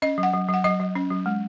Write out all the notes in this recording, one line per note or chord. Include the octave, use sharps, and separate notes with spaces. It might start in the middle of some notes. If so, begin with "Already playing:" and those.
C#4 D#5
F#3
F#5
F#3
F#3 F#5
F#3 D#5
F#3
C#4
F#3
G#3